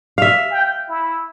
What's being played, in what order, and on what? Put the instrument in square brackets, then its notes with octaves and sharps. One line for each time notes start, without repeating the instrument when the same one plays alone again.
[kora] E5 F5
[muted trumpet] G5
E4